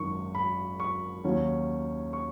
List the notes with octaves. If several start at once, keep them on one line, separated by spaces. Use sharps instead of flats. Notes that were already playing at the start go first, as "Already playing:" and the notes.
Already playing: G#1 F#2 D#3 C#6
B5
C#6
D#2 D#3 F#3 C#4
C#6